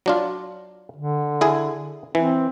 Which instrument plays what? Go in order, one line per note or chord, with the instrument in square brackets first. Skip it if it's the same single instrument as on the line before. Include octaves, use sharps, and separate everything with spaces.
[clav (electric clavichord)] F#3 D4 F4
[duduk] D3
[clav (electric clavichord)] E4 G#4 G#5
[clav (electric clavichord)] E3 [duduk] C4